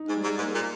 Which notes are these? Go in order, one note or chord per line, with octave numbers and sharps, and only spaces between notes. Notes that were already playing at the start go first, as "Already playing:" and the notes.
Already playing: D#4
G#2
G3
G#2
G#2 A#3
A#2